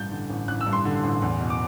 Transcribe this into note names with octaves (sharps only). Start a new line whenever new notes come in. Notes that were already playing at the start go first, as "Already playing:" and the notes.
Already playing: A1 G2 G6 A6
D3
A1
A1 F#6
E6
G2
C6
D3
A1
E2
B2
D6